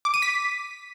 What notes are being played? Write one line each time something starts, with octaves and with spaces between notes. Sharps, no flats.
D6
D#7
B6